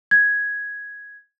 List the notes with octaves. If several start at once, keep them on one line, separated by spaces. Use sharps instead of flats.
G#6